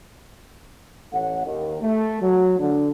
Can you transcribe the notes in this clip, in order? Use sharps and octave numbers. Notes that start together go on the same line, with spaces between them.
A1 A3 C#5 F#5
D#2 D#3
A3
F#3
D3